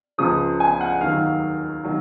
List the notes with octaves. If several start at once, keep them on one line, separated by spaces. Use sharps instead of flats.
C#2 C#3 F3 D#6
G#5
F#5
D#2 D#3 F#3 F5
D#3 F#3